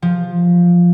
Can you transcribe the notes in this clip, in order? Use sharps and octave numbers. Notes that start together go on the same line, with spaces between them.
F3